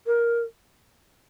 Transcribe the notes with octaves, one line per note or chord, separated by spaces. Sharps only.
A#4